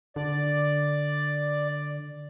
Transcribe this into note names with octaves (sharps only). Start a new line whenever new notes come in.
D3 D5